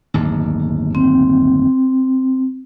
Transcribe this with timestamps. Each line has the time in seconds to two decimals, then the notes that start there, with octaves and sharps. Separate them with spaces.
0.14 D1 G1 D#2
0.95 C4